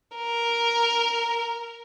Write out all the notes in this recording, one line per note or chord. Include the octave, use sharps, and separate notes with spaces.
A#4